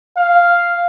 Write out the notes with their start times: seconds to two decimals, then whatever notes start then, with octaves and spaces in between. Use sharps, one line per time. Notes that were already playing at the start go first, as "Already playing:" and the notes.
0.17 F5